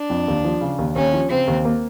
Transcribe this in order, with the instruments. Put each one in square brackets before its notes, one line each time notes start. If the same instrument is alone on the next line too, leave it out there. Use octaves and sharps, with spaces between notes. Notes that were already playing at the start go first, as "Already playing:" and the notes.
Already playing: [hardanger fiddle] D4
[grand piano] F2
D#2
F3
C#3
D#2
[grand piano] D#2 [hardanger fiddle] C#4
[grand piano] F3
[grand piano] C#3 [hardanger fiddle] C4
[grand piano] D#2
A#3